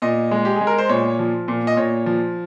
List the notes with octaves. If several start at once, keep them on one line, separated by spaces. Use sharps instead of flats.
A#2 D#5
G#3
G4
G#4
G#3
A#4
C5
A#2 C#5
F3
A#2
D#5
A#2 C#5
F3